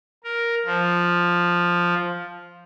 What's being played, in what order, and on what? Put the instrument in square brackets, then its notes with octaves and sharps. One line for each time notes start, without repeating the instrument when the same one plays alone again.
[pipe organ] A#4
F3